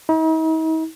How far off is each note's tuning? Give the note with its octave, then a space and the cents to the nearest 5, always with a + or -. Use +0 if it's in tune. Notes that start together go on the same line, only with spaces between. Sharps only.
D#4 +45